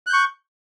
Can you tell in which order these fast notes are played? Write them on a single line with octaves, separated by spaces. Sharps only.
F#6 G6 C#6